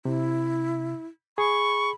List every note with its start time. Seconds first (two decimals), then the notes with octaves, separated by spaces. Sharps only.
0.05 C3 E4
1.38 G#4 B5 C#6